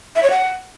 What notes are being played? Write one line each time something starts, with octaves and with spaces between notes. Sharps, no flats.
E5
C#5
F#5